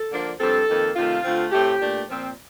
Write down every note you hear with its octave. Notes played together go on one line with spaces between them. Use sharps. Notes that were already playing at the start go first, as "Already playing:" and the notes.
Already playing: A4
D3 F3 A#3 D4
G2 F3 C4 A4
F2 D#3 A#3
C3 D#3 A3 F4
D3 A3 C4
A2 A3 C4 G4
A#2 A3 D4
A#2 F3 C4